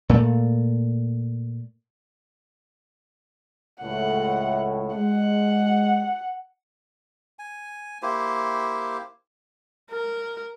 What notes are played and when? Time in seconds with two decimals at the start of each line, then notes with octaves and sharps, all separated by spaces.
0.09 A#2 A3
3.82 C#2 A2 F#5
4.95 G#3 F#5
7.39 G#5
8.02 A#3 E4 G4 C5
9.91 A#4